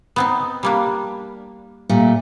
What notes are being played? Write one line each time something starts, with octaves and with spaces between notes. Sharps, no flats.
B3 C4 D#4
G3 A#3 D4
A#2 G3 A3